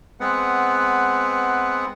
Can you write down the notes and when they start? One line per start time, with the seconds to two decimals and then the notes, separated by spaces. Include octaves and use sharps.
0.20 G#3 B3 C4 B4 F#5